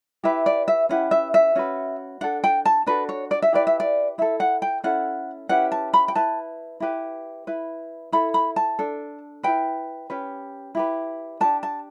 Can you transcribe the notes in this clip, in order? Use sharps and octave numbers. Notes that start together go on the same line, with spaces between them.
E4 G4 B4 E5
D5
E5
C#4 E4 G4 B4 F#5
E5
E5
C#4 F#4 B4
D4 A4 F#5
G5
A5
D4 F#4 A4 B4
C#5
D5
E5
E4 G4 B4 D5
E5
D5
E4 A4 E5
F#5
G5
C#4 E4 A4 F#5
C#4 E4 G4 B4 F#5
A5
B5
G5
E4 B4 A5
E4 G4 B4
E4 B4
E4 A4 B5
B5
A5
D4 A4
E4 B4 G5
C#4 G4 B4
E4 G4 B4
D4 G4 B4 A5
A5